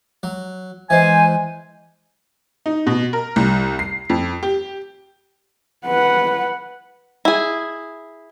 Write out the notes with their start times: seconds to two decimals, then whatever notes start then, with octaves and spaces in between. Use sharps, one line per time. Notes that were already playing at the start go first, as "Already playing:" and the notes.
0.23 F#3
0.90 E3 G#3 C5 G#5
2.66 D#4
2.87 B2
3.13 A#4
3.36 C2
3.79 C7
4.10 F2
4.43 G4
5.86 B4 F#5
7.25 E4 G#4